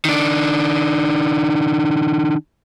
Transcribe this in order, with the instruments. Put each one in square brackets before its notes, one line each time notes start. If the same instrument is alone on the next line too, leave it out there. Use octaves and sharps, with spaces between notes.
[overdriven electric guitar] D#3 D4